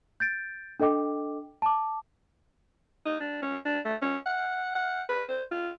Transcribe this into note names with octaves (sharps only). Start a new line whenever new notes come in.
G6 A6 D7
D4 A4 D#5 G5 D6
A5 D6
D#4
D4
C#4
D4
A3
C#4
F#5
F#5
B4
C5
F4